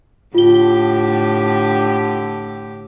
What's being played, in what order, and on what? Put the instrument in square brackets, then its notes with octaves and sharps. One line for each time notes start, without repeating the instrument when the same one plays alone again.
[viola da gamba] A2 D3 G4 [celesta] F4 G7